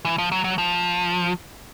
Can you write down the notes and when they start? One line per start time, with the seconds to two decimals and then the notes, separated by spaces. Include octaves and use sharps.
0.05 E3
0.18 F3
0.32 F#3
0.44 F#3
0.58 F3